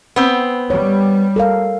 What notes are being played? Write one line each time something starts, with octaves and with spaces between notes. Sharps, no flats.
B3 C4
G3 C#5
A4 A#4 F5